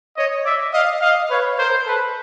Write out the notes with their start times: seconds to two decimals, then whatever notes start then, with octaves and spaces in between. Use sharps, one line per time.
0.17 C#5 D#5
0.45 D5 E5
0.74 D#5 F5
1.02 D#5 F5
1.30 B4 C#5
1.59 A#4 C5
1.87 A4 B4